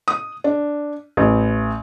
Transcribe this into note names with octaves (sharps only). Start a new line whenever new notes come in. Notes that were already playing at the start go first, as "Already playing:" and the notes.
D#6
D4
A1